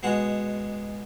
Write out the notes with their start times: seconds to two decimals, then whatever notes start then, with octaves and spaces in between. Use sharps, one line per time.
0.03 B2 G#3 F#4 F#5